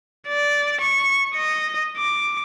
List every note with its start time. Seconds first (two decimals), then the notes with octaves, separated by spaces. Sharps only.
0.27 D5
0.80 C#6
1.35 D#5
1.97 D6